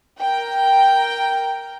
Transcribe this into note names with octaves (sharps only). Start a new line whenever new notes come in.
A#4 G5